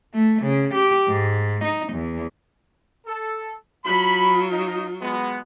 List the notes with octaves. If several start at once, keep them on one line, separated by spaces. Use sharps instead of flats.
A3
C#3
G4
G#2
D#4
E2
A4
F#3 F4 B5
D#4
G#3 B3